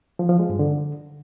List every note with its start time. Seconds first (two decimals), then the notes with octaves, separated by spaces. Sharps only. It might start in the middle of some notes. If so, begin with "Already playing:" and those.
0.19 F3
0.29 F3
0.39 G#3
0.49 G2
0.59 D3